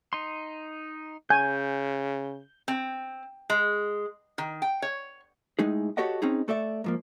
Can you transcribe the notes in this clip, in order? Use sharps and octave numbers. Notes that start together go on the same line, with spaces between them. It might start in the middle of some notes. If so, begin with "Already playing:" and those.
D#4 C6
C#3 G#5 G6
C4
G#3
D#3
G5
C#5
A2 G#3 D#4 G#4
F#4 G4 A4 C#5 D#5 F#5
C4 C#4 D#4 G#4
A3 A4 D5 E5
G#2 F3 A#3